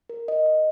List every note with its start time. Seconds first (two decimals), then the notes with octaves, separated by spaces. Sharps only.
0.09 A#4
0.28 D#5
0.46 D#5